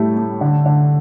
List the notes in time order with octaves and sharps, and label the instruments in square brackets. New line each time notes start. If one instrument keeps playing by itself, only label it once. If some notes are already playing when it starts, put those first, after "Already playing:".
Already playing: [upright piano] A2 G3 A3
A3
D3
D3